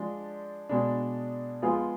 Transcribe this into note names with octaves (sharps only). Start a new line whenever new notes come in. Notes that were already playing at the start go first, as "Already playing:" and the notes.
Already playing: F3 G#3 D4
B2 G#3 D4
F3 G#3 B3 F4 G#4